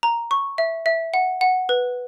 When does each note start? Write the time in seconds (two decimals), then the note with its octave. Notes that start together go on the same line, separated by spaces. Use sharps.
0.03 A#5
0.31 C#6
0.58 E5
0.86 E5
1.14 F#5
1.41 F#5
1.69 B4